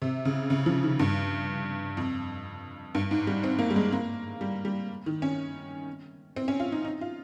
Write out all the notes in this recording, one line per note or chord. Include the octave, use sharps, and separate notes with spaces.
C3
C#3
C#3
F3
D#3
G2
F2
G2
G#2
G3
C4
A#3
G3
G#3
A#3
G3
G3
D#3
C#4
C4
C#4
F4
D#4
D#4
F4